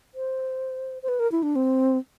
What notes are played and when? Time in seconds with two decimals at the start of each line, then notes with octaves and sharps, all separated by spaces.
0.15 C5
1.03 C5
1.08 B4
1.20 A#4
1.32 E4
1.43 D4
1.56 C4